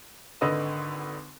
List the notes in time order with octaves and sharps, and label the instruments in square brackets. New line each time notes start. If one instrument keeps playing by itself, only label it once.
[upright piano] G#1 D3 B4 D#5 D#6 E6